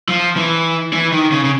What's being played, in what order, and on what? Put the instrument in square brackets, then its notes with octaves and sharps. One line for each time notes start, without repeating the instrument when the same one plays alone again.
[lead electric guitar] F3
E3
E3
D#3
C#3
C#3